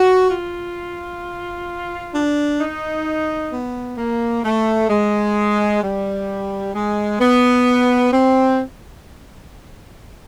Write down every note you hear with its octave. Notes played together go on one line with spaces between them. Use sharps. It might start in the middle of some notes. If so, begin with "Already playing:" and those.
Already playing: F#4
F4
D4
D#4
B3
A#3
A3
G#3
G3
G#3
B3
C4